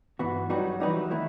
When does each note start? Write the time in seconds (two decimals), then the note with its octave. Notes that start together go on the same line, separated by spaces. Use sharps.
0.19 G2 E3 B3 F#4
0.49 F#3 G3 D#4 F#4 B4
0.80 E3 G3 D#4 F#4 B4
1.11 D#3 A3 E4